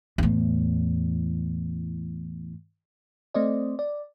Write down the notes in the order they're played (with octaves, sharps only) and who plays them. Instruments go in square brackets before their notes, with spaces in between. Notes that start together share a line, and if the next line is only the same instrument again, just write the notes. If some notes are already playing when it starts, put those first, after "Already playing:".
[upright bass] E2 A2
[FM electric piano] A3 C4 C5 D5 D#5
D5